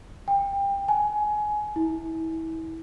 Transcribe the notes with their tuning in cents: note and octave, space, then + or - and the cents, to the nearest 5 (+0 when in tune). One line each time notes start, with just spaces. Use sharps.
G5 +25
G#5 +20
E4 -30